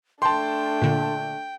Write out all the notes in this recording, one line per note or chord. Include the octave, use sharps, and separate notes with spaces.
A3 D4 G5 A5 C6
A#2 D3